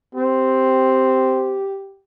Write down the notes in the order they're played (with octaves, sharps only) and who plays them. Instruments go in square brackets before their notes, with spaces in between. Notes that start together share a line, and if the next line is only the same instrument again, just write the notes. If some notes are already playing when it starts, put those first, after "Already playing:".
[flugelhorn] C4 [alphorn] G4